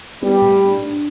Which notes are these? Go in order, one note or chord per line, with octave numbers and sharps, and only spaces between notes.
G3 B3
A2
D4
D4